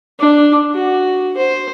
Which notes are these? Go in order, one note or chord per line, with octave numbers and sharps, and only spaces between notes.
D4
F#4
C5